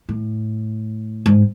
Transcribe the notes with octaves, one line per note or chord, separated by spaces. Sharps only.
A2
G#2